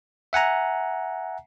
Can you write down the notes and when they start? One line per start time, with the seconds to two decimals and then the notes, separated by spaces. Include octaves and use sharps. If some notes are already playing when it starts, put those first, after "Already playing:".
0.33 E5 F#5 G#5 A#5